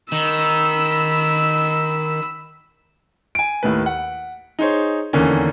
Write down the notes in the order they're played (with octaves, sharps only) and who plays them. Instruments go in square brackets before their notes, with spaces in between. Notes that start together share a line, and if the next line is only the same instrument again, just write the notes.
[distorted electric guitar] D#3 [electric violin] B5 E6
[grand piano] G#5 D7
D#2 A2 B4
F#5
D#4 G#4 C5 C#5
E2 D3 D#3 A#3 C#4